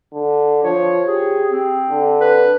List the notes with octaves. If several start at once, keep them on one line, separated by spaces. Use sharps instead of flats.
D3
F3 C#5
G4 G#4
C4
D3
B4